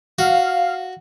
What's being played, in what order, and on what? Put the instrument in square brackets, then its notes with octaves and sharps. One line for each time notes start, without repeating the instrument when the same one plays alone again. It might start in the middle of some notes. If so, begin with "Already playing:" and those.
[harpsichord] F#4 [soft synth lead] F5